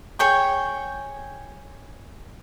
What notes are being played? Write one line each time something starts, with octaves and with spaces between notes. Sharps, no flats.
G#4 C#5 G5 C#6